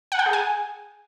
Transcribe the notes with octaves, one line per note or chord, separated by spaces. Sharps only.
F#5
G5
G#4
G#5